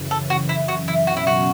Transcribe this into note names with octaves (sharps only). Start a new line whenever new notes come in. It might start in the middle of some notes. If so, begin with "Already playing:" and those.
Already playing: F#2 C#3 E3
A4
F#4
E4
F#4
E4
B2 F#3 C#4 F#4
E4
F#4